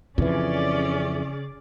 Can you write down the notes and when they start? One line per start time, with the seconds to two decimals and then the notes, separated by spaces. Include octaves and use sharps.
0.18 F2 C#3 E3 C#4 G#4 D5